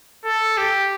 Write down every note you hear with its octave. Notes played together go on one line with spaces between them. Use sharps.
A4
G4